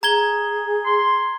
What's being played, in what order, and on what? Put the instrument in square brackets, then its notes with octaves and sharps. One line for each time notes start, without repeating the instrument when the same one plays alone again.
[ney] G#4 [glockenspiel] A#5 G#6 G7
[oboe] C6